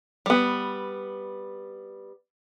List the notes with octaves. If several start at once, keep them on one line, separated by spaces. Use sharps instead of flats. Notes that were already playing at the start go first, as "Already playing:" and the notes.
G3 B3